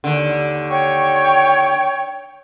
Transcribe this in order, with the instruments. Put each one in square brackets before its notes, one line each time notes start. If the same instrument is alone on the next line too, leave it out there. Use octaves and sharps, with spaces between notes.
[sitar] D#2 D3
[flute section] C#5 G5 C#6